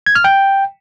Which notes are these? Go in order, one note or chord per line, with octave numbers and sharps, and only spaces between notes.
G#6
F6
G5